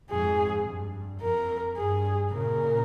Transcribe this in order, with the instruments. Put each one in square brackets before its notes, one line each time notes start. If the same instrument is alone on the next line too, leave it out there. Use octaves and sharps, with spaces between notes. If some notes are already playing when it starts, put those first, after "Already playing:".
[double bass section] F2 G#2 [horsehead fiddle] G#4
[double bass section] G2
[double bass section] F2 [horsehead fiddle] A#4
[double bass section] G2 [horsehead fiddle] G#4
[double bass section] A#2 C#3 [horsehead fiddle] A#4